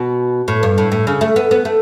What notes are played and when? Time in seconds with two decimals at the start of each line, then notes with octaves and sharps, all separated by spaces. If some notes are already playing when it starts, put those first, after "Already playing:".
Already playing: B2
0.48 A2
0.63 G2
0.78 A2
0.92 A2
1.07 C#3
1.21 A3
1.36 B3
1.51 B3
1.65 A3